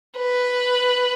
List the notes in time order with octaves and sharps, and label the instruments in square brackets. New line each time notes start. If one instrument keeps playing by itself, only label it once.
[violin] B4